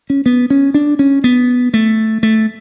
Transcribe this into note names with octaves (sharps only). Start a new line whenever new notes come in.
C#4
B3
C#4
D4
C#4
B3
A3
A3